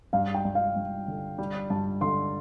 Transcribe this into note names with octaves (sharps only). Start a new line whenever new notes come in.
G2 F5
G5
G2
F5
G2
D3
G3
G2 A5
D3 C6